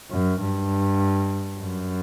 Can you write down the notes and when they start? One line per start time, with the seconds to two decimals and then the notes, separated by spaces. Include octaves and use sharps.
0.11 F#2
0.41 G2
1.59 F#2